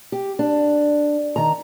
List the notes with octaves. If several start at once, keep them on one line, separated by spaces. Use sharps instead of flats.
G4
D4
D#3 A#5